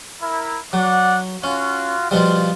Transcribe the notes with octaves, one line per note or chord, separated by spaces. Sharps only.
E4 A#4
F#3 D5 F#5
C#4 F4 F#4
B2 F3 G3 F4